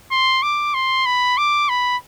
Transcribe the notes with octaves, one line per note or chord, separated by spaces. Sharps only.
C6
D6
C6
B5
D6
B5